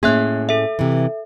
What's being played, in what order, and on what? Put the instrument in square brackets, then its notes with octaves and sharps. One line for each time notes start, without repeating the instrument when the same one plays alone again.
[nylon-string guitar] A2 C#4 G#4 [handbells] A#3 E5 F#6
[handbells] A4 E5
[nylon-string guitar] C3 E3